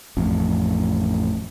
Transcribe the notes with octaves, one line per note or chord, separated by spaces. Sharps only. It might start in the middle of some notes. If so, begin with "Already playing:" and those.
A1 F2